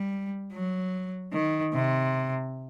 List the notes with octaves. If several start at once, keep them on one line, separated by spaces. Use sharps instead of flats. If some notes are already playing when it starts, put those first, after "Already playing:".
Already playing: G3
F#3
D#3
C3